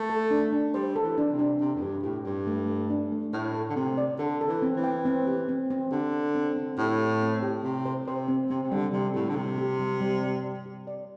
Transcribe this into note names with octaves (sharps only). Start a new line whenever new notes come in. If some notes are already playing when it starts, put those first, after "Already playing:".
Already playing: A3
A4
D4
D4
G3 C5
A4
E3
D4
C3
D4
C3 D4
E2
G2 G4
A2 G4
G2 G4
A3
A3
D4
A3
A2 A4
A4
D3
C3 C4
D5
D3 A4
A4
E3
C4
E3
G5
C4
G4
C4
C4
D3 G4
C4
C4
C4
A2 G4
G4
C4
G4
C3 G4
C5
C3 C5
C4
C3 C4
C3
D3 G3
C3 G3
A2 G4
D3
C3 G3
G4
G3
G3
D5
D5
G4
D5